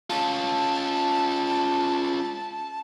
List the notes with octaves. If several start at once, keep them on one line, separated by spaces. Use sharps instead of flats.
C#4 F4 A5